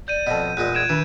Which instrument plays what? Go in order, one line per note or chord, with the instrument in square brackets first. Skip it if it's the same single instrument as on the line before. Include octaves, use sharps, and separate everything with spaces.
[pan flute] D5 [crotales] G6 D#7
[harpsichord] F2 B2 [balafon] D#5 A5
[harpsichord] E2 A#2 G#3 [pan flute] F4 [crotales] F#6
[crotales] G#6 D7 E7
[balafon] D#3 D4 B4 [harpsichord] E3